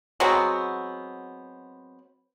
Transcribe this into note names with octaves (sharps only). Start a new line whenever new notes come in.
F#3 G#3 B3 C4